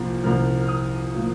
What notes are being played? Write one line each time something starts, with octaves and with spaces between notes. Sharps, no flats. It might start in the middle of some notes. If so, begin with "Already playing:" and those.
Already playing: C2 A#2 F3 A#3
C2 A#2 F3 A#3 F6
F6
D#6
A#2 F3 A#3